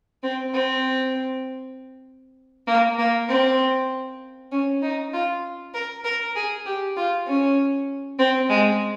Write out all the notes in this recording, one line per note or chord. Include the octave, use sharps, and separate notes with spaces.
C4
C4
A#3
A#3
C4
C#4
D#4
F4
A#4
A#4
G#4
G4
F4
C#4
C4
G#3